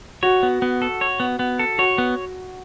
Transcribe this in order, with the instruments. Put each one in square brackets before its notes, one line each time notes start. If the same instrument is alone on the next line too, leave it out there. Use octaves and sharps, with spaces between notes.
[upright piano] F#4 [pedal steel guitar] C#5
[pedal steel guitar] B3
B3
A4
C#5
B3
B3
A4
[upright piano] F#4 [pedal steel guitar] C#5
[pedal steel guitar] B3